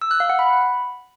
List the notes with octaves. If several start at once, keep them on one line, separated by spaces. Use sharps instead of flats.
E6
F#6
F5
F#5
B5